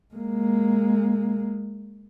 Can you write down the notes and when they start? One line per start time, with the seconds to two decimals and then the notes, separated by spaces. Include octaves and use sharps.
0.14 G#3 A#3